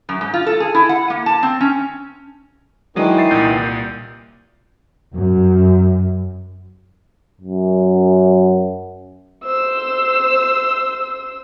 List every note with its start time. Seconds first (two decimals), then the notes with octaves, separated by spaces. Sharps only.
0.09 F#2
0.21 G#2
0.34 F4
0.46 A4
0.60 G#4
0.75 E4
0.89 F#5
1.10 A#3
1.26 A5
1.43 C4
1.61 C#4
2.96 D#3 E3 F#3 G#3 D4 D#6
3.18 E5 A6 C7
3.31 C2 A#2 G6
5.14 F#2
7.41 F#2
9.44 C5 E6